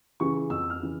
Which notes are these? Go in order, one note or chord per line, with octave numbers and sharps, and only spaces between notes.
C#3 E3 C#6
F2 E6
F6
C#3 E3